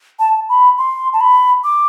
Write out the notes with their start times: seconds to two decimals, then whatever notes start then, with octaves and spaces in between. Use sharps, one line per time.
0.19 A5
0.49 B5
0.78 C6
1.13 A5
1.21 B5
1.64 D6